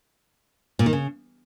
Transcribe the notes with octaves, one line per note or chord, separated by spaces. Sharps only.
A#2
D#3
C#3